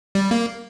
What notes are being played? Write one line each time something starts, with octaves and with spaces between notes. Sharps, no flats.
G3
A#3